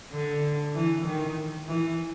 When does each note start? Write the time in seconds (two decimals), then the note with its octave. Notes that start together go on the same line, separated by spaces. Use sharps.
0.12 D3
0.75 E3
1.05 D#3
1.67 E3